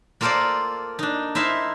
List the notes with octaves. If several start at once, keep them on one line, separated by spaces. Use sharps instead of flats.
A#3 F4 A4 A#4 C5 D5
D4 D#4
D#4 E4 C5 E5 F5